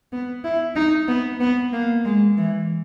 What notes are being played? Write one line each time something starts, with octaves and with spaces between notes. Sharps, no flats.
B3
E4
D#4
B3
B3
A#3
G#3
E3